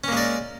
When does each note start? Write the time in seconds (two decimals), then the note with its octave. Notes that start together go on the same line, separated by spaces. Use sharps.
0.04 C#4
0.08 A#3
0.13 G#3
0.17 D5